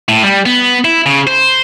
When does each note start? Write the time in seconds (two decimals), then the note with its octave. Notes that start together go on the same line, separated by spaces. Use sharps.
0.08 A2
0.24 G3
0.46 B3
0.85 E4
1.06 C#3
1.27 C5